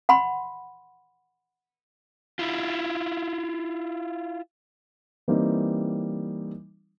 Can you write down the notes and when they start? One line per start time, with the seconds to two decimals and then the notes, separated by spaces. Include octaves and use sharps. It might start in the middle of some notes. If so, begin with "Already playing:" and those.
0.09 F#5 B5 C6
2.39 E4 F4
5.28 E3 G3 A#3 C4 D#4